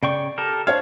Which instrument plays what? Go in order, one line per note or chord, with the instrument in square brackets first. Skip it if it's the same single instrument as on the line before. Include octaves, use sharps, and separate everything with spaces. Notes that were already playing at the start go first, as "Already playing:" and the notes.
[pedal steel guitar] C#3 G5 C#6 [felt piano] D5
[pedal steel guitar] G4 A4 A#4
[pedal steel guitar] D4 F5 [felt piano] C5 C#5 G#6